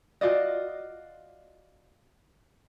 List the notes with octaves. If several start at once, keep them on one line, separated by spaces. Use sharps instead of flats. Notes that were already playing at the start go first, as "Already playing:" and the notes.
F4 F#4 D5 D#5